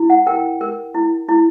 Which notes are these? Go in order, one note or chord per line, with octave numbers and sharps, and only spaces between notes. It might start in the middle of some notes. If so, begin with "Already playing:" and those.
Already playing: E4
F#5
A#4 G5
A#4
E4
E4